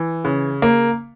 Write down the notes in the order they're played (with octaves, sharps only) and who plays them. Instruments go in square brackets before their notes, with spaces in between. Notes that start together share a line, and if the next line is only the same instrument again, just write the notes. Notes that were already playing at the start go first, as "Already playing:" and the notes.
Already playing: [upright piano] E3
C#3
A#3